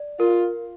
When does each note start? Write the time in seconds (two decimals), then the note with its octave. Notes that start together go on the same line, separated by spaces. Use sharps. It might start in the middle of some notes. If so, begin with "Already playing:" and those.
Already playing: D5
0.19 F4 A#4